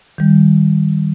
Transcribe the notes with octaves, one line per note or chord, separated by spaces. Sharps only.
D#3 G3